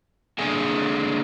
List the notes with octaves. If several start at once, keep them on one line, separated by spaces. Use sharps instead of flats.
D3 A#3 G#4 A4 E5 G#5